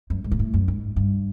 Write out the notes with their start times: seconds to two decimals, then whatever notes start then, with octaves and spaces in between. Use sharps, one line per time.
0.10 F#2
0.24 G#2
0.31 A#2
0.39 A2
0.54 F#2
0.68 G#2
0.96 G2